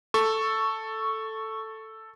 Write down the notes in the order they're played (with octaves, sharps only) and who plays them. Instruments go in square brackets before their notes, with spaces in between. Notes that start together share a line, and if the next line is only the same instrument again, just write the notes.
[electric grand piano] A4 [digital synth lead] C#6